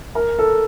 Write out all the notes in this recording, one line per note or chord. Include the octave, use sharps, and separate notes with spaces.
A#4
A4